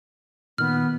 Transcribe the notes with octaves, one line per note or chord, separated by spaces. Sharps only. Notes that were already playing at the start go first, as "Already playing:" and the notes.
A#2 D#3 B3 F6